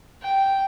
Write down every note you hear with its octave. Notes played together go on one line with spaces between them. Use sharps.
G5